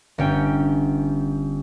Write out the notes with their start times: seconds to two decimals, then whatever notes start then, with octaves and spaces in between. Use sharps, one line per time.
0.18 G1 C#4 G5